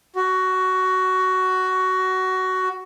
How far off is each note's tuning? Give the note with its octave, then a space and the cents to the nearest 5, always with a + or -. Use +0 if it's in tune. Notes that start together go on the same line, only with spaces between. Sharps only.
F#4 +15